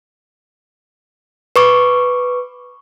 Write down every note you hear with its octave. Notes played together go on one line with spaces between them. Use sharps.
B4 C#6 D6